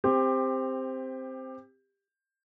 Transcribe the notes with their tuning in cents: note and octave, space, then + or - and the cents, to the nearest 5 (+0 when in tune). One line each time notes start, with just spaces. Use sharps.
C4 +0 G4 +20